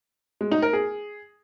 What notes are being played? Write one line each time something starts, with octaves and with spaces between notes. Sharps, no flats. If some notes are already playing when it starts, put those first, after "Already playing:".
G#3
D#4
A#4
G#4